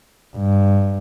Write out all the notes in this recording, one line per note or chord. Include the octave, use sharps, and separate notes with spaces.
G2